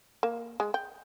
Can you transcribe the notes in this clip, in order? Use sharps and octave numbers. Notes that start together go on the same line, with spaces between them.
A#3
G#3
G5